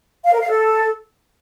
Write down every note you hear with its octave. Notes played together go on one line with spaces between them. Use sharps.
F5
A#4
F5
A4